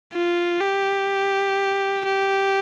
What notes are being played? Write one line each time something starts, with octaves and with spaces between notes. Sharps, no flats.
F4
G4
G4